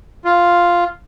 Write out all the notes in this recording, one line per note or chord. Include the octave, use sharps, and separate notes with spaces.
F4